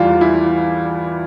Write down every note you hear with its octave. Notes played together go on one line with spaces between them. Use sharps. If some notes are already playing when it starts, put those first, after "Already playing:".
Already playing: E2 E3 G3 F4
E4